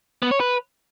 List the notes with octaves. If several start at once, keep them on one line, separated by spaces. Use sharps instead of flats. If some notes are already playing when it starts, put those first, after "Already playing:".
B3
C#5
B4